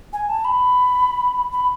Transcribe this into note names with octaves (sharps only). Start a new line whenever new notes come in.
G#5
A5
B5
B5